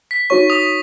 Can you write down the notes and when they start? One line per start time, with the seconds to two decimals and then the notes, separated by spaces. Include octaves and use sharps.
0.11 B6
0.30 D#4 F#4 C#5 C#6
0.50 D#6